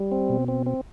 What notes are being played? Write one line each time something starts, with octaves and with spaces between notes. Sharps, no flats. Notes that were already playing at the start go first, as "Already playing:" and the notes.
Already playing: G3
C4
B2
C4
C4